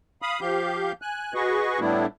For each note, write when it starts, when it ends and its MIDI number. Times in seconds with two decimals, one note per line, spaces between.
0.22 0.40 77
0.22 0.40 83
0.22 0.40 87
0.41 0.92 53
0.41 0.92 67
0.41 0.92 77
0.41 0.92 91
1.02 1.34 80
1.02 1.34 90
1.34 1.80 66
1.34 1.80 68
1.34 1.80 71
1.34 1.80 75
1.34 1.80 85
1.80 2.06 45
1.80 2.06 55
1.80 2.06 57
1.80 2.06 59
1.80 2.06 62
1.80 2.06 64